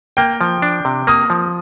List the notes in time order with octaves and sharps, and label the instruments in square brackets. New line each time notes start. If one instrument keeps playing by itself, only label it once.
[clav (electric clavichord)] A#3 [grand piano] G5
[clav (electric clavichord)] F3
D4
C3
[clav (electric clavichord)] A#3 [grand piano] D#6
[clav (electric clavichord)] F3